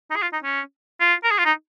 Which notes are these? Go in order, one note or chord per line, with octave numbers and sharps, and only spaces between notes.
D#4
G#4
F4
D#4
C#4
F4
A#4
G#4
F4
D#4